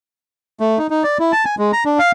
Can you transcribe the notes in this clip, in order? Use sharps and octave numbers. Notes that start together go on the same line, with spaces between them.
A3
D#4
D#4
D5
E4
A5
G#5
G#3
A#5
D4
F5